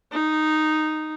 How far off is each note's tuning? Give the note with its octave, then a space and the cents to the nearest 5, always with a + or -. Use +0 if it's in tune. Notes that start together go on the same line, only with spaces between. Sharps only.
D#4 -5